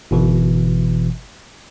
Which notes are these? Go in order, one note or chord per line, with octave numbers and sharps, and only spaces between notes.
G1 B2 E3